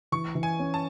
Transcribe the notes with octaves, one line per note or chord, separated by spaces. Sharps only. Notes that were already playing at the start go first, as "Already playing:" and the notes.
E3 C#6
E3
G#5
C#4
A5